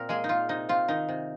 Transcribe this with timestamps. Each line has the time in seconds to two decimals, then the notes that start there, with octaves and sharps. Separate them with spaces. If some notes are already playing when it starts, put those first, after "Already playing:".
Already playing: A#2 C4 A#4
0.09 G#3 A#3 G#4
0.24 D#4
0.29 A#2 F4
0.49 C3 D#4
0.69 C4 F4
0.88 D#3 D#4
1.09 C3